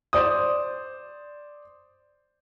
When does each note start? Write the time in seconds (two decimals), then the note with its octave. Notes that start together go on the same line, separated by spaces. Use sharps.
0.13 C5 D5 D#6